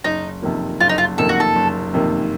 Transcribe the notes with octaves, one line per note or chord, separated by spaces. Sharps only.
F#1 D#4
F2 C3 D#3 A#3
F#1 F4
D#4
F4
F2 C3 D#3 A#3 A4
F#4
A4
F#1
F2 C3 D#3 A#3